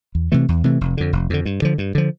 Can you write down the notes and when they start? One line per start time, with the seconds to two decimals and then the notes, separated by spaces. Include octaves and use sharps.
0.15 E2
0.32 C3 E3 A3
0.49 E2
0.64 C3 E3 A3
0.81 F1
0.97 F2 D3
1.13 F1
1.30 F2 D3
1.45 G2
1.62 D3 F3
1.78 G2
1.95 D3 F3